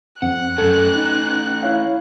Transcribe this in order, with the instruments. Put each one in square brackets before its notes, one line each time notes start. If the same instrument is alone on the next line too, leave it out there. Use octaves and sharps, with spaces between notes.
[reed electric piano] F2 C4 [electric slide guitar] F#5 [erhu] F#6
[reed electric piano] F#2 A4 [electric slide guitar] A3 C#4
[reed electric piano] D#4
E4 C#5 F5